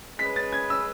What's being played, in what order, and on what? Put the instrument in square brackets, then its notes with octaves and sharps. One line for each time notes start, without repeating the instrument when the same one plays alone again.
[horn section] G#3 C#4 G#4 B4 [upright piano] B6
[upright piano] A6
G#6
E6